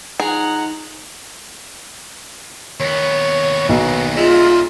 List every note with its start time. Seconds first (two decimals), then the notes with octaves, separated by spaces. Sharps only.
0.20 F3 D#4 G#4 F#5 A#5
2.80 D#2 B3 C#5
3.69 B1 B2
4.16 G#3 F4 D5 E5